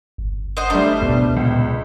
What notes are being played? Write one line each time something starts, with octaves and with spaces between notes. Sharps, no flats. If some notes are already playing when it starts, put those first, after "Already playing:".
G1
C5 D#5 F#5
G3 A3 D4 C5
C#2 B2 B3
C#2 A#2